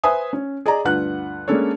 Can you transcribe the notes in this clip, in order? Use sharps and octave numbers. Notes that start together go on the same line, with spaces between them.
B4 C5 E5 G#5 D#6
C#4
G#4 D5 D#5 A#5
D2 G2 F4 B4 F#5 F#6
G#3 A#3 C#4 D4 A4 C#5